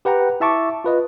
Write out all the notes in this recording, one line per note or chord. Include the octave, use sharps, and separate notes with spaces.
G4 B4 F#5 G5 A#5
E4 E5 A5 C#6 D6
F4 B4 D#5